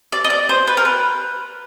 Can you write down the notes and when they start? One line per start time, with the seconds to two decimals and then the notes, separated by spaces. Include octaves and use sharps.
0.12 D5
0.24 D#5
0.30 D5
0.49 C5
0.67 B4
0.77 A#4
0.85 B4